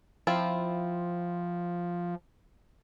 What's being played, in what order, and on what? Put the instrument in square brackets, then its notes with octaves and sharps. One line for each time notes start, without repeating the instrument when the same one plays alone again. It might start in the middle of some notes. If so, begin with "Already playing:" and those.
[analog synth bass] F3 [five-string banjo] C4 E4 F4